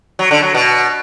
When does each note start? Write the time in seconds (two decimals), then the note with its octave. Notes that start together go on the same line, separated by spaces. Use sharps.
0.19 F#3
0.31 D3
0.43 F#3
0.54 B2